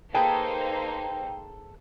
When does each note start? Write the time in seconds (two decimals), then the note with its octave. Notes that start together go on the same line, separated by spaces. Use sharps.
0.14 A#3 D#4 G#4 A4 B4 C5 G5